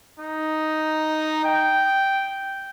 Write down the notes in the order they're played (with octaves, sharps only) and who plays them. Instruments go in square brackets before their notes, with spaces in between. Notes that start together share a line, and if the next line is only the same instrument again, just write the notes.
[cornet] D#4
G5